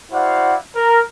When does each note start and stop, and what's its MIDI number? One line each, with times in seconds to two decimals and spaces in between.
0.12 0.55 64
0.12 0.55 66
0.12 0.55 72
0.12 0.55 74
0.12 0.55 77
0.12 0.55 78
0.75 1.00 70